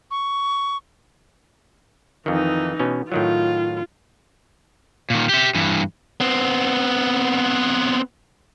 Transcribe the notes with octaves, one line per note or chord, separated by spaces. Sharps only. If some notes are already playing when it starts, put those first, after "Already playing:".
C#6
F2 D#3 E3 D#4
B2 C#4
A2 D#3 F#3 F4
A#2 D#3
G4 E5
G2 E3
B3 C4